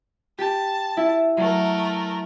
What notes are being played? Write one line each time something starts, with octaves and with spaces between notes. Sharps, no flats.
G4 A5
E4
F#3 A3 A#4